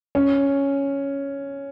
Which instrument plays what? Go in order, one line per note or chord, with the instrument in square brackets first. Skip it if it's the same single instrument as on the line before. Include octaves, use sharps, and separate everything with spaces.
[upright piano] C#4